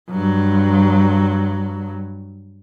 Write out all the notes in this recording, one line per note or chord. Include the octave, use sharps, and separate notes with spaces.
G2 F#3